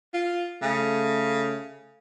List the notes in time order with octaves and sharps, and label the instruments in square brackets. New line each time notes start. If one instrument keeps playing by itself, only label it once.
[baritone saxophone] F4
[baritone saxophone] C#3 [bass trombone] A3